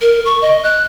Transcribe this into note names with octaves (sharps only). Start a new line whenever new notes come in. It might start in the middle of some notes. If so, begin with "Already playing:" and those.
A#4
C#6
D#5
F#6